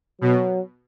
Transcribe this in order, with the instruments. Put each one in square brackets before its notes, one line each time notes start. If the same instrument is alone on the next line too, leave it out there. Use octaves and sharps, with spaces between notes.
[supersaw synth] B2 [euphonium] F#3